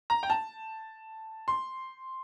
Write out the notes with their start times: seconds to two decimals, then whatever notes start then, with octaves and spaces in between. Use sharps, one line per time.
0.10 A#5
0.23 G5
0.30 A5
1.48 C6